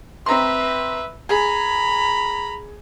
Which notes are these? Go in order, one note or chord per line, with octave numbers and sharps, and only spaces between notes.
C4 B4 E5 A#5 C6
G#4 A#5 B5